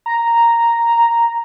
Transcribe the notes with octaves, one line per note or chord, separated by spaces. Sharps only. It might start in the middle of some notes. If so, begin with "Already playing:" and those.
A#5